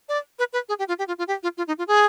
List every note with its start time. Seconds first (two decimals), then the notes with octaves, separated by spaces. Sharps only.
0.09 D5
0.39 B4
0.53 B4
0.69 G#4
0.79 G4
0.88 F4
0.99 G4
1.08 F4
1.18 F4
1.27 G4
1.43 F4
1.57 F4
1.67 D#4
1.78 F4
1.87 G#4